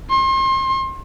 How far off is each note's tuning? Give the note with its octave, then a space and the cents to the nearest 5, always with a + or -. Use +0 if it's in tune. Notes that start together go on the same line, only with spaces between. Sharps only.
C6 +35